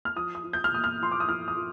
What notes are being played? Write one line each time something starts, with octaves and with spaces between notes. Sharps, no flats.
F6
F3 D#6
D#6
F3
G6
F6
A#2 D#6
F6
F3 C6
D6
D#6
F3 F6
D#6
F3